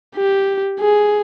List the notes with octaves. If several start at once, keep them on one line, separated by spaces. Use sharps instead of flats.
G4
G#4